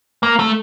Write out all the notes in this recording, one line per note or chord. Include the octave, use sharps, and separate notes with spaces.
A#3
A3